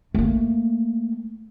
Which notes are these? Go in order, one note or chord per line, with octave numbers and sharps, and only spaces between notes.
A3 A#3